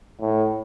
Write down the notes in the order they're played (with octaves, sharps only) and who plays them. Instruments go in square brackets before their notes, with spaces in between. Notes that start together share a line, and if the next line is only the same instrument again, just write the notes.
[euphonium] A2